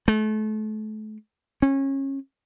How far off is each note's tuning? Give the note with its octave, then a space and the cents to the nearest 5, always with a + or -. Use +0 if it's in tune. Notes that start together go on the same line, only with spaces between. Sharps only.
A3 -35
C#4 -25